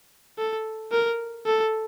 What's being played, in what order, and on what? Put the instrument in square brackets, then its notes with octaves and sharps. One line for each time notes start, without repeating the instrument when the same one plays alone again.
[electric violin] A4
A#4
A4